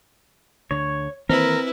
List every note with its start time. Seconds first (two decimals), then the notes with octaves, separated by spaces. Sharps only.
0.71 D2 D3 C#5
1.29 D#3 E3 A#3 C4 E4 A#4 B4